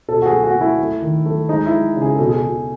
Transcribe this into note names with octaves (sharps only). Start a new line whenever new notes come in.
B2 A4
F#4
G#4
A3
F#4
A3
E4
A3
D#3
A3
G#3 D#4
E4
G#3
C#3
G#4
B2 A4
G#4
B2